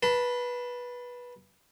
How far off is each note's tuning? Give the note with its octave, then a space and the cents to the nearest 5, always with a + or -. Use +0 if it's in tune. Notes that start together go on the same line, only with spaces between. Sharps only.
B4 -15 A5 +5 C6 -45